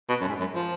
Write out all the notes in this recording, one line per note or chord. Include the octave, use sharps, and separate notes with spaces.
B2
F#2
G#2
F#2
F3